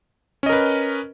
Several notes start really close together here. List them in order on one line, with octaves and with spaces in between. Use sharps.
C#4 D#5 A#4 B4